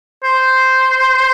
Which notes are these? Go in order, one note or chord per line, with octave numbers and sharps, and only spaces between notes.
C5